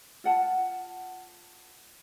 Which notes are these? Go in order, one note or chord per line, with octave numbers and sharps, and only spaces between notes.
F4 F#5 A5